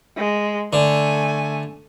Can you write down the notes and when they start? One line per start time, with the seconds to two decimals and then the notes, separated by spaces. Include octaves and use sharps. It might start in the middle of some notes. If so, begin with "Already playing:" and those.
0.17 G#3
0.73 D3 A3 G#5